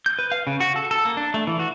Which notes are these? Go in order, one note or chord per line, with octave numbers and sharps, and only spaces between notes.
G6
B4
F5
C#3
F#4
A4
A4
A#3
D4
A3
E3
F#4